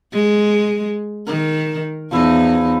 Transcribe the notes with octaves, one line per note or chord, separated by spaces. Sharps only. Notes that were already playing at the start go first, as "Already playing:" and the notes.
G#3
D#3 A#4
E2 F3 D#4 E4